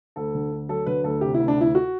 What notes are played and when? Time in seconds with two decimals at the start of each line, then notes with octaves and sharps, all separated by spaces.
0.16 D2 A4
0.35 D3
0.52 D2
0.69 F#3 A4
0.86 D3 B4
1.04 D2 A4
1.21 C3 G4
1.34 E4
1.39 D2
1.48 D4
1.57 D2 E4
1.75 F#4